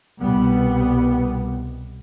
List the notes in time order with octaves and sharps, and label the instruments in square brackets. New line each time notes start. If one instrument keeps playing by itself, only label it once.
[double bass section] C2 B2 G3 B3